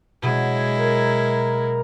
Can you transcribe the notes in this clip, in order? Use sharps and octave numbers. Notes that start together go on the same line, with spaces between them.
B2 F#3 G#3 E4
A#4